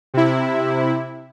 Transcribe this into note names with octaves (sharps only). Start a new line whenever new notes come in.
C3 E4